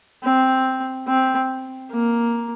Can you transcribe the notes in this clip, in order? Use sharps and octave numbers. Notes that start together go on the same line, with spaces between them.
C4
C4
A#3